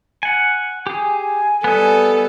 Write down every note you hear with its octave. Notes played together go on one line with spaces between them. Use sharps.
F#5 G#5
G4 G#4 G#5
G3 B3 A4 D#5